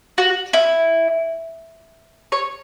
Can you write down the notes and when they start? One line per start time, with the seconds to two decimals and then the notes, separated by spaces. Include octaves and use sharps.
0.18 F#4
0.53 E4
2.32 C#5